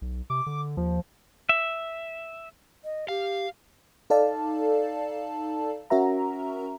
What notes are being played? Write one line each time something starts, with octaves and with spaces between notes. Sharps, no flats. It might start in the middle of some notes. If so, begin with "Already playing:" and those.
B1
C3 D6
D3
D#2 F3
E5
D#5
G4 F5
D#4 A4 D5 F5 A5
C#4 F#4 A#4 E5 A#5